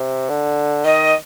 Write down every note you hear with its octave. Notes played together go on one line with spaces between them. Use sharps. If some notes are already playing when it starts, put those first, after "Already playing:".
Already playing: C3
D3
D#3 D#5